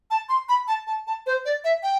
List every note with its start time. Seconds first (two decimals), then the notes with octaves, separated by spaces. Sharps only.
0.11 A5
0.29 C6
0.49 B5
0.68 A5
0.87 A5
1.07 A5
1.26 C5
1.45 D5
1.64 E5
1.83 G5